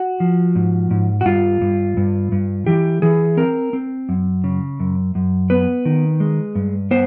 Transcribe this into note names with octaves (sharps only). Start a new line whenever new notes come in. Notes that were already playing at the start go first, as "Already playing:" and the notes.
Already playing: F#4
F3
G#2
G#2
F#4
G2 F4
G2
G2
G2
E3 G4
E3 G#4
C4 A#4
C4
F#2
C#3
F#2
F#2
B3 B4
D#3
G#3
G2
B3 C5